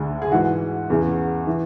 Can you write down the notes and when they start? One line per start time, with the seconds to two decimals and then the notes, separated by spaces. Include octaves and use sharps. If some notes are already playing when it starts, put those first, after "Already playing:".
Already playing: D2 D3 G#4
0.22 G#4
0.32 G#2 E3 F#4
0.90 E2 C#3 E3
1.47 E3